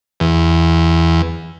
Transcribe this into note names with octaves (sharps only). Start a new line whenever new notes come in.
E2